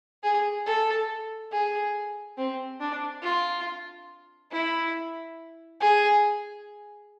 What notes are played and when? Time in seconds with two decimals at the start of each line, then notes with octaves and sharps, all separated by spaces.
0.23 G#4
0.66 A4
1.52 G#4
2.37 C4
2.80 D4
3.23 F4
4.51 E4
5.80 G#4